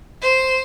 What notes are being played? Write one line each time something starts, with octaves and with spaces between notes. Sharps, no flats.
C5